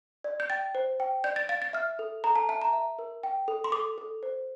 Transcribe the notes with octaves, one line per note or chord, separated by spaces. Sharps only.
D5
G6
G5 A6
C5
G5
D5 G6
A6
F5 A6
A6
E5 F6
A4
A4 A#5
A5
E5 A5
A#5
E5
A#4
G5
A4
C6
A4 D6
A4
C5